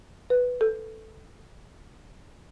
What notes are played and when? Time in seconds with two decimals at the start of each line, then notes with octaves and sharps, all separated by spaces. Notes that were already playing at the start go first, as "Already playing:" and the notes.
0.30 B4
0.61 A4